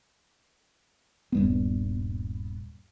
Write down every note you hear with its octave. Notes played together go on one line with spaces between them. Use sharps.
D#1 G2 B3